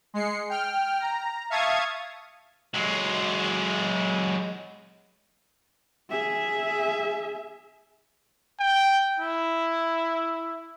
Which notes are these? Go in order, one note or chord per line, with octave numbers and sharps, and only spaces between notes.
G#3 C7 C#7
G5 F6
A#5
E5 F5 A5 C#6 D#6 G#6
F#3 G#3
G#4 E5
G5
E4